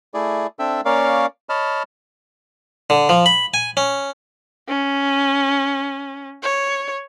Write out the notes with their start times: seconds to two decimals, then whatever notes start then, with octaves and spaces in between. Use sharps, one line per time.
0.14 A3 E4 G#4 D5
0.59 C4 D4 A4 E5 G5 E6
0.85 A#3 C#4 A#4 C#5 D5 F5
1.49 C#5 D#5 A5 B5 F6
2.90 D3
3.09 F3
3.26 B5
3.54 G#5
3.77 C#4
4.68 C#4
6.43 C#5